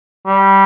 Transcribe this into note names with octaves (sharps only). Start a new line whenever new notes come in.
G3